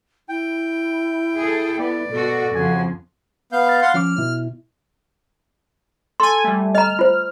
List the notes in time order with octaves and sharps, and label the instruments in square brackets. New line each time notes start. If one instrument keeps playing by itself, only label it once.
[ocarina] E4 [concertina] G5
[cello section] G#4 A4
[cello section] B3 [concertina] D5
[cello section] B2 F#4 [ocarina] A4
[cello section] F2 C#3 F3 [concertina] F#4 G#5
[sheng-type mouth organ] B3 F5 G6
[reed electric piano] B5 F6 A6
[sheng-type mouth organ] F5 F#5 C6
[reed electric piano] F3 C#4 D6 [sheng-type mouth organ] F6
[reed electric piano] B2 E4
[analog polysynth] A4 G#5 [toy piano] C6
[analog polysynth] G3 A3
[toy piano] D#5 A#5 [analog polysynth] F6
[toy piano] F4 C5